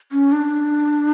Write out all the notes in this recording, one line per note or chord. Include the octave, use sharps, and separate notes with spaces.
C#4
D4